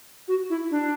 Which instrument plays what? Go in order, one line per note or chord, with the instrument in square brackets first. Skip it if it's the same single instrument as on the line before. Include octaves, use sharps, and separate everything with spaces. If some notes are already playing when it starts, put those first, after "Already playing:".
[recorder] F#4
E4
D4